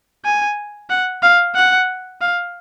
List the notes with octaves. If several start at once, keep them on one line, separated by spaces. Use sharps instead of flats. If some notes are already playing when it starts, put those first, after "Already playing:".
G#5
F#5
F5
F#5
F5